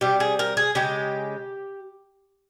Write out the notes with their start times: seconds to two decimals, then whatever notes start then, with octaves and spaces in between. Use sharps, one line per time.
0.01 C3 G3 G4
0.20 G#4
0.39 A#4
0.57 G#4
0.75 C#3 G#3 G4